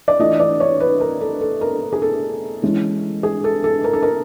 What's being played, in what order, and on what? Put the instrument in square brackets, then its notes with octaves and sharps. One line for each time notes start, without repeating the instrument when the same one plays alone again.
[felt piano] D5
E3 A3 D4 F4 D#5
D5
C#5
B4
A#4
A4
A4
A#4
G#4
A4
E3 G#3 C#4 E4
G#4
A4
A4
A#4
A4
A#4